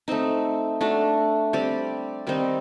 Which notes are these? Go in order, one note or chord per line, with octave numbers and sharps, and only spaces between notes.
A3 C4 D#4
A3 D4 F#4
G3 C4 G4 D5
D#3 G3 C4 D#4